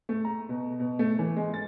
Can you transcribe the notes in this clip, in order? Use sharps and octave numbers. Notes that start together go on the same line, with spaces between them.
A3
A#5
B2
B2
A3
E3
G#3
A6